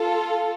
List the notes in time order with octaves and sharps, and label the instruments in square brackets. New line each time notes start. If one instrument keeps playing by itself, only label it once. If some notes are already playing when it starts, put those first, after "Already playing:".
Already playing: [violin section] F4 A4